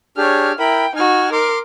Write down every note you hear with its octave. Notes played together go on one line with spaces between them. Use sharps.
D4 G4 G#4 C#5 F6
E4 A#4 G5 B5
D#4 F#4 G#5 F6
A#4 C6 D6